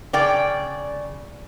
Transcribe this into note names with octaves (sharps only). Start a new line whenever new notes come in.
C#3 D5 G5